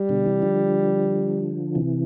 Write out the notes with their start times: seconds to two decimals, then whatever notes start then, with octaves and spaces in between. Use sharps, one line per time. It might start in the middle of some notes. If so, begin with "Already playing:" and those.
Already playing: G3
0.09 B2 D3
0.26 C3 E3
0.42 D3 F3
1.75 C3 E3